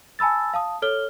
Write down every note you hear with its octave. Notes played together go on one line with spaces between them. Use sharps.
G#5 A5 B5 E6 A6
F5 A5 D#6
A4 C#5 F6 G7